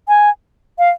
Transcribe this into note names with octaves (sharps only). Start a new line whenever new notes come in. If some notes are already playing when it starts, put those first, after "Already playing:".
G#5
F5